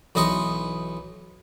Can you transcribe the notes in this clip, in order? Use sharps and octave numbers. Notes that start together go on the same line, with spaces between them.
B1 E3 D#4 D#5 C6 C#6